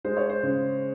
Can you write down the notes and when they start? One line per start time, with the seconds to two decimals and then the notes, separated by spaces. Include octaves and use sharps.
0.05 G#3 C5
0.17 C#5
0.29 C5
0.43 C#3